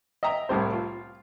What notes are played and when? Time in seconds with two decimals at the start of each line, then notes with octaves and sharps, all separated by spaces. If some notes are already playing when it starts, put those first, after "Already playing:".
0.23 D#5 E5 G5 A#5
0.49 C2 A2 G3 C5
0.73 F4